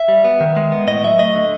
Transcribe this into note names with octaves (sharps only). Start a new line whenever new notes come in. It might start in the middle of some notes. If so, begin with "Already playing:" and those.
Already playing: E5
G3
B3
D#3
G#3
B3
A2 D#5
F#3 E5
A3 D#5
D3